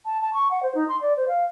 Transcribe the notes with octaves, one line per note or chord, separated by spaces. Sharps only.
A5
A5
C#6
F#5
C5
D#4
C6
D5
C5
F5